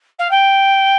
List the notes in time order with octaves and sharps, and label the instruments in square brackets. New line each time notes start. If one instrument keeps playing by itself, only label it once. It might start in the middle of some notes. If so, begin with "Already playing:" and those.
[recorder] F5
G5